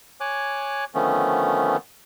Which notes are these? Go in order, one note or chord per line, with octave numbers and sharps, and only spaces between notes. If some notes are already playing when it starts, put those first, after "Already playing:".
C#5 G#5 D6 F#6
D3 D#3 F3 A3 B3 C#4